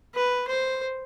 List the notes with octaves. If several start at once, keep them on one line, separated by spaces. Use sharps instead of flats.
B4
C5